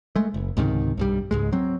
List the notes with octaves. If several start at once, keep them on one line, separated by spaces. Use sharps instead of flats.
G#3 A3
F#1
C#2 G#2 C3 D#3
B1 G2 G3
C#2 G#2 G#3
F#3 C4